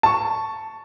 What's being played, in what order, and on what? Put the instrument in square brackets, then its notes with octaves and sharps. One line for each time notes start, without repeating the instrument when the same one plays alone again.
[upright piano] A5 C#6